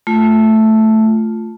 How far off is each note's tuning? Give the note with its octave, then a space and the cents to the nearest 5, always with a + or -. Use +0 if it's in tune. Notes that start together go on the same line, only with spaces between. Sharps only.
A3 +0 F4 +0